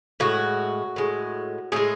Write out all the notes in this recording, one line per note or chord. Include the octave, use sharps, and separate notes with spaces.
A2 G#3 F#4
A2 G#3
A2 G#3 G#4